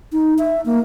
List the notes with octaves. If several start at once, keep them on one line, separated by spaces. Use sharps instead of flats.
D#4
E5
A#3